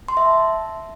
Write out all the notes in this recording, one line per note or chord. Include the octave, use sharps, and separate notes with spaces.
C6
E5
A5